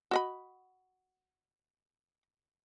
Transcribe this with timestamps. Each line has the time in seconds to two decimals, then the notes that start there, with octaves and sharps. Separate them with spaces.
0.11 F#4 D#5 B5